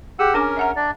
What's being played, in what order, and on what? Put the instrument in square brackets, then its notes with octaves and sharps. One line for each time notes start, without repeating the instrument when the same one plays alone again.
[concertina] G4 F#5 E6 [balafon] G#4
[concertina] C#4 A#4 [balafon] D4 G#5 D6
[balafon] E5 F#5 A#5
[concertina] D4 D5